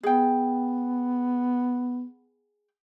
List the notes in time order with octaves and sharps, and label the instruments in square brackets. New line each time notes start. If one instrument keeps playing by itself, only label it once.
[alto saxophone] B3 [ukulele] G#4 G5